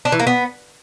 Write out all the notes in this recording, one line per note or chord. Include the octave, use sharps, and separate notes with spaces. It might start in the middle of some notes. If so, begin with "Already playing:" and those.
D4
E3
A#3
B3